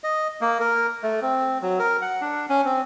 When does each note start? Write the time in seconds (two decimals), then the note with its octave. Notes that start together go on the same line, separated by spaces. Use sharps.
0.04 D#5
0.41 A#3
0.60 A#4
1.03 A3
1.22 C4
1.62 F#3
1.79 A#4
2.02 F#5
2.21 D4
2.50 C#4
2.65 C4